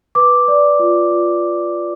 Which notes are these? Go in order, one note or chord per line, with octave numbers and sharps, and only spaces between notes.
B4 D6
D5
F4
F4